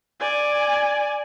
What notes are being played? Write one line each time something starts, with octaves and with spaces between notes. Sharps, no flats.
D5 G#5